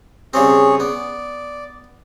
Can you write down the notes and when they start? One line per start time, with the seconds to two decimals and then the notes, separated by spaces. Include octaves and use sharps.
0.34 C#3 G3 C4 G#4 C#5
0.80 B3 D5